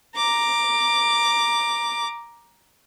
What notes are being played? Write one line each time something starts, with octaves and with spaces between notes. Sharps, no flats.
A#5 D6